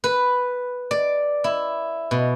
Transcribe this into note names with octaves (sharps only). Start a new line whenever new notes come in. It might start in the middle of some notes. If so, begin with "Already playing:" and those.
B4
D5
E4
B2